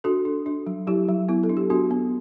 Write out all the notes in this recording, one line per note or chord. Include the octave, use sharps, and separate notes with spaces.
D4 F#4 A4
D4
D4
F#3
F#3 E4 G4
F#3
B3 E4
A4
D4
G4
B3 D4 F#4
B3